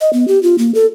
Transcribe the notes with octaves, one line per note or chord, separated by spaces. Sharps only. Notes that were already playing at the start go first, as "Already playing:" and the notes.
D#5
B3
G4
F4
A#3
A4